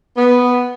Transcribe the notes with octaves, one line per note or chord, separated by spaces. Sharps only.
B3